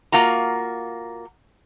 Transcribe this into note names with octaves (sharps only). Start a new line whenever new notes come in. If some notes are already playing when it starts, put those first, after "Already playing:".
A#3 F4 F#4 A#5